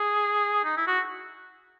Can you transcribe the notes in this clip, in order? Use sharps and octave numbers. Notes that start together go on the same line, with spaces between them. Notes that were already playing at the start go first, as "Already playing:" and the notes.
Already playing: G#4
D#4
E4
F#4